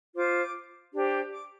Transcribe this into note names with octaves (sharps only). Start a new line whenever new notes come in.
F4 C5 D6
D4 G4 C5
D6